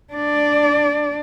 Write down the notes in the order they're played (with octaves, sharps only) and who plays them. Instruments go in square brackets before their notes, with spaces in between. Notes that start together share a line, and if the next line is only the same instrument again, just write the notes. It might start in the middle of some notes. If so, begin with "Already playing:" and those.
[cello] D4 D5